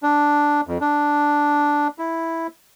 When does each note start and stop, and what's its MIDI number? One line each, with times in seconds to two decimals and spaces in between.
0.03 0.61 62
0.67 0.78 41
0.81 1.88 62
1.99 2.47 64